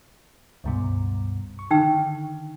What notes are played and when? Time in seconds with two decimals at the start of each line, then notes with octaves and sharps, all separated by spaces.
0.64 C#2 G2 B2
1.59 C#6
1.71 D3 D#3 D#4 G5 E6